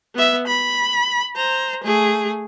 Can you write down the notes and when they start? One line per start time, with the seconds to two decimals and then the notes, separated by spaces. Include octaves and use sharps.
0.15 B3 E5
0.47 B5
1.36 C5 A#5
1.84 A3 G#4